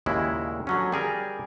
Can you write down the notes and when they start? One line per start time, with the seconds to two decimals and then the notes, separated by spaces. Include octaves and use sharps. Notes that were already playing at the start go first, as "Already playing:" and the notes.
0.06 D#2 A#2 C#3 G#3 E4
0.67 D3 F#3 C#4
0.92 G3 G#4 A#4